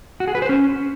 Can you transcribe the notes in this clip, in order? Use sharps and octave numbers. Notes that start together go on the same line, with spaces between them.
F#4
G#4
B4
C5
C#4